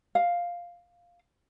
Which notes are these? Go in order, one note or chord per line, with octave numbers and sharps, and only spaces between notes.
F5